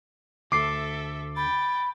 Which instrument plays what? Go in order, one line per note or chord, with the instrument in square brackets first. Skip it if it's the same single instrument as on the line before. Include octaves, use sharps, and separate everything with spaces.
[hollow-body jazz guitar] D2 [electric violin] A4 E5 [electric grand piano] D6 C7
[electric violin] G5 A6 [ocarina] B5